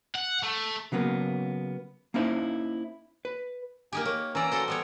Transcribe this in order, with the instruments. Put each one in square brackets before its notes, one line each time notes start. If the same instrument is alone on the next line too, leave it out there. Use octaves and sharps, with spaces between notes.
[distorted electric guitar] F#5
A3
[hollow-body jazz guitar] C#3 F#3 A#3 B3
A#3 C#4 D#4 E4 C5
B4
[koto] A#3 D#4 G4 [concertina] G#5
[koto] A#3 [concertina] C#5
[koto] E3 D5 [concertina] C#4 A#5 E6
[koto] F#4 A4 C5
G3 B3 C#5